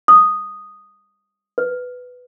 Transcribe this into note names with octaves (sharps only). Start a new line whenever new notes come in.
D#6
B4